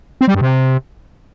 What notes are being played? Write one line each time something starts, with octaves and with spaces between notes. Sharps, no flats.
C4
G3
G2
C3